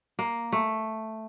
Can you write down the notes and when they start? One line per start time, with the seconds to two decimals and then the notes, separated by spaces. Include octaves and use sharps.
0.19 A#3
0.52 A3